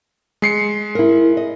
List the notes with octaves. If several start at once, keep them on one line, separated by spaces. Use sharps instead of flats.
G#3 C7 C#7
E4 A#4
D#5